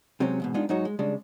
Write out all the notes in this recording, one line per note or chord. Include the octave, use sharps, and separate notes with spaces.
C3 F#3 G#3 C4 C#4
E2 G#2 B2
G#3 B3 D4 D#4 F4
G#2 F#3 D#4 F#4 C#5
G#3
C#3 G3 G#3 D4